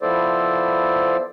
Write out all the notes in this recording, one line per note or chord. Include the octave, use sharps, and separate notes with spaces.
F3 B3 E4 A4 C5 D5